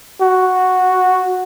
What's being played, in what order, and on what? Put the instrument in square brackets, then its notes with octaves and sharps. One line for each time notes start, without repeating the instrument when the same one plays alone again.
[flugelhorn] F#4